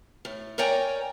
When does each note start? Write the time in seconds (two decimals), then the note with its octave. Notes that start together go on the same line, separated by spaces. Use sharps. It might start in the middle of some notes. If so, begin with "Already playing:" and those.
0.25 A2
0.58 A#4 C#5 D5 G5 G#5 A#5